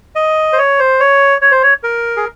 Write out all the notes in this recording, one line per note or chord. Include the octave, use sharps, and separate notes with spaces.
D#5
C5
C#5
C5
C#5
C#5
C5
C#5
A#4
G#4